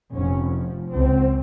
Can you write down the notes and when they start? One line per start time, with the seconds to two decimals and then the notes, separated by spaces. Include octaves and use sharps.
0.13 F1 C#4
0.51 F3
0.92 C#2 C4